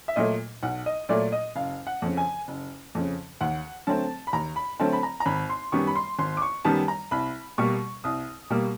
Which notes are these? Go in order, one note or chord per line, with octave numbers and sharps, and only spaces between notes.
E5
A#2 F#3 A3 D#5
B1 F#5
D#5
A#2 F#3 A3 D5
D#5
F#1 F5
F#5
F2 C#3
G#5
F#1
F2 C#3
D#2 F#5
D3 F#3 A3 C4 A5
B5
D#2 A#5
B5
D3 F#3 A3 C4 A5
B5
A#5
A#5
G#1 B5
C6
F#2 D#3 G3 B3 C#6
B5
C6
G#1 C6
D6
C#6
F#2 D#3 G3 B3 A5
A#5
C2 B5
B2 G3 A#3 C#6
C2 D#6
B2 G3 A#3